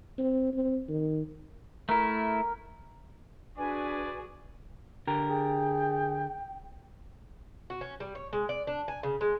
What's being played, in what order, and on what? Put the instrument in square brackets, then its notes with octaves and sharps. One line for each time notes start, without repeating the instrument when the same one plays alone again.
[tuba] C4
C4
D#3
[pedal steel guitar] A3 E4 [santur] A#4
[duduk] D4 [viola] F#4 G#4 [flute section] B4 G#5 [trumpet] D5
[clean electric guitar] D3 G4 A#4
[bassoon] G#4 [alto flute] G5
[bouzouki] F#4
C#4
G3
C#5
G#3
D5
D4
G#5
C#3
G#3